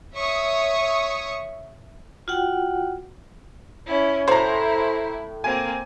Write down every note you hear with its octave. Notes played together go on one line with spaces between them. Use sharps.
C#5 E5 C#6 D#6
F4 F#4 F#5 G5
C#4 E4
A2 E4 C5 A#5
A#3 C4 G#5